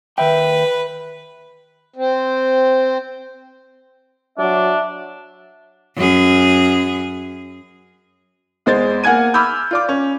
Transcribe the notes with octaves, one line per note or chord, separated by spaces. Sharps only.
D#2 B4 E5 G5
C4
F#3 D4 E5
F#2 G#4
E2 G#3 C5 A6
A#3 F#5 G#5 G#6 D#7
B5 D6 E6 F6 G6
F4 D5 D6
C#4